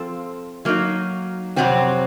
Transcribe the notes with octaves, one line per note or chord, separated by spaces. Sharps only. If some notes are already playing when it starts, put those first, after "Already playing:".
Already playing: F3 C4 F4 A4
F#3 A#3 D#4
F2 C3 F#3 C4 F#4